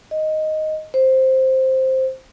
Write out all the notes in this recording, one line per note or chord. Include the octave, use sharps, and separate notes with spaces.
D#5
C5